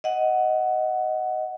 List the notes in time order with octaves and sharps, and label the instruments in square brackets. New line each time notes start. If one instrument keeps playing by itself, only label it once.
[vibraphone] D#5 F#5